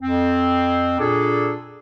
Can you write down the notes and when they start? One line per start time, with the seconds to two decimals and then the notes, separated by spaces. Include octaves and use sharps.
0.02 F2 C4
0.99 A#2 D4 G#4 A4